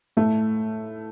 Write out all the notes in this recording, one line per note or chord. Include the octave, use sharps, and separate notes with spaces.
A2 A3